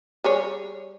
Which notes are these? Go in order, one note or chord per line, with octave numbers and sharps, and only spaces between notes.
G3 G#4 C#5